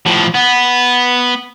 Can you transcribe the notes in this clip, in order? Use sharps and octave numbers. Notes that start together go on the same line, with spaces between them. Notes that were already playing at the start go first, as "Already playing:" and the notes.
A2 F3
B3